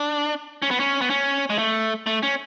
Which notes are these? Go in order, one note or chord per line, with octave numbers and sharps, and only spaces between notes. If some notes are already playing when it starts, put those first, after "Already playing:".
Already playing: D4
C#4
B3
C#4
B3
C#4
G#3
A3
A3
C#4